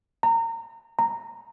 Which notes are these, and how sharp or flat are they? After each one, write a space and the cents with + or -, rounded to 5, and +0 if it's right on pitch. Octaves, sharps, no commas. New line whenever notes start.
A#5 -30
A#5 -15